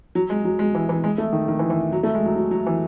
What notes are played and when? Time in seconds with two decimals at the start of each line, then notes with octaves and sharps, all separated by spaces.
0.15 F#3
0.30 G#3
0.45 F#3
0.59 G#3
0.75 E3
0.89 E3
1.04 G#3
1.18 A3
1.33 D#3
1.48 D#3
1.59 E3
1.70 E3
1.92 F#3
2.03 A3
2.15 G#3
2.26 F#3
2.36 F#3
2.51 F#3
2.66 E3